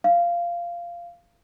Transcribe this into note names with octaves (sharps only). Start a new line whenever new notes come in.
F5